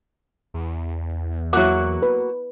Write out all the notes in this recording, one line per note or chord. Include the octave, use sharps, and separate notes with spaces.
E2
F#3 A#3 E4 F#4 F#5 D6
B4